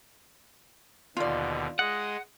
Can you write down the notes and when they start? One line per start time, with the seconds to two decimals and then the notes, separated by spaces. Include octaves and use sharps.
1.17 D#2 B2 D3 F4 D5
1.79 G#3 D#5 F#5